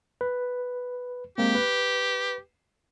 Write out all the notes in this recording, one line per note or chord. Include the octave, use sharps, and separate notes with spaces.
B4
G#3 A#3 C4 G4
B4